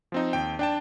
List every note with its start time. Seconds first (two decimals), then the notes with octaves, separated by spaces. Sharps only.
0.12 F3 C4 D#4
0.33 D#2 G5
0.59 D4 G5 A5